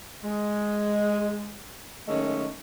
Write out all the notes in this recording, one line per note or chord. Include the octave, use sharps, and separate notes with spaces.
G#3
D#3 F#3 G#3 A3 C#4 D#4